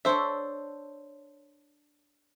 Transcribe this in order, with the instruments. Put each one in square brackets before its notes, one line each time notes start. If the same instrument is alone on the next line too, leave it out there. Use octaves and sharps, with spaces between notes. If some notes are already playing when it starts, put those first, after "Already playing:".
[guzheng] D4 A4 C#5 [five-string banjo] C5 E5